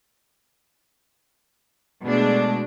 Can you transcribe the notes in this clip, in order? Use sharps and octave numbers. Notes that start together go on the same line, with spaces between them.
B2 G#3 A3 D4